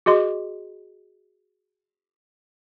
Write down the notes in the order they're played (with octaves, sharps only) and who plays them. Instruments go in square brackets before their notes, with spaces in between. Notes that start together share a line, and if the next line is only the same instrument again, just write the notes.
[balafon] F#4 G#4 D#5 C6